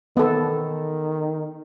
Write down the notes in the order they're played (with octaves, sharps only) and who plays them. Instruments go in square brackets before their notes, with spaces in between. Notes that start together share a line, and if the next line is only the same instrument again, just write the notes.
[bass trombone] D#3 [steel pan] B3 A4